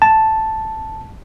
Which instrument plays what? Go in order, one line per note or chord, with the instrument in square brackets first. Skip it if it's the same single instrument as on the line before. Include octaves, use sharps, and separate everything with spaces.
[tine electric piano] A5